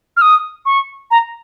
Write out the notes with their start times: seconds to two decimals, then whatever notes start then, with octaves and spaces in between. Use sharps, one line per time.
0.17 F6
0.22 D#6
0.66 C#6
1.11 A#5